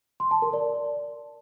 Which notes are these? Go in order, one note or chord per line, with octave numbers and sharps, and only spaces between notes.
C6
A5
A#4
D5